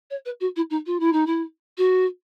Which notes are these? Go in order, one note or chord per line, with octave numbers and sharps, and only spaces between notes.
C#5
B4
F#4
E4
D#4
F4
E4
D#4
E4
F#4